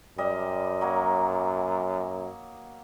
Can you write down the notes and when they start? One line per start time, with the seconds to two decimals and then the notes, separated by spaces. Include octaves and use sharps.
0.18 F#2 G3 D#5
0.81 F#3 A#3